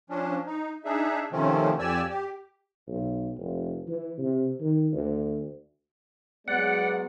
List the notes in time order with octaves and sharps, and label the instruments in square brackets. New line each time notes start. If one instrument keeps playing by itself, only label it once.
[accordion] F3 C#4 D4
D#4
D4 D#4 G#4 E5
C3 D#3 F3 A3 C4 C#4
F2 G4 D5 G#5 E6
G4
[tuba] B1
F1
E3
C3
D#3
D2
[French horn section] F#3 G#3 B3 [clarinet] D5 [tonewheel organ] F#5